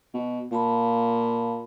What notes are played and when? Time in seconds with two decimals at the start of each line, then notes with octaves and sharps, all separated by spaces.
0.14 B2
0.51 A#2 F5 A5 B5